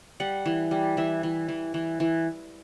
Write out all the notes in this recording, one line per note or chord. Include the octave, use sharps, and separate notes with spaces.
G3 F#5
E3
G3
E3 E5
E3
E3
E3
E3